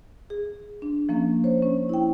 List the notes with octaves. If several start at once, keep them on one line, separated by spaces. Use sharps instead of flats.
G#4
D4
F3 A#3 C#4
C5 C#5
C#4
E4 G5